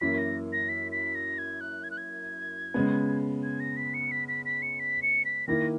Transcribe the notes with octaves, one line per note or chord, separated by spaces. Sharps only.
F#2 E3 A#3 E4 B6
A#6
A#6
B6
B6
A#6
G#6
F#6
G#6
F#6
G#6
C#3 G#3 B3
G#6
A#6
B6
C#7
B6
B6
B6
C#7
B6
C#7
B6
D#3 A#3 E4 A#6